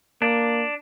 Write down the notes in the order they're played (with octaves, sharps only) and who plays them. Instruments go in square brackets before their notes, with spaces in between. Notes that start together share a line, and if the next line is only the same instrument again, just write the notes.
[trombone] A#3 [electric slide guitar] D4